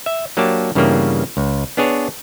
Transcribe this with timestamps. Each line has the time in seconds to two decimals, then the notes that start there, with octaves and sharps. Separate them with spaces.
0.06 E5
0.37 F#3 A#3 D4 G4 A5
0.75 G2 C#3 E3 G3 A#3 B3
1.37 C#2
1.77 B3 D4 G#4 C#5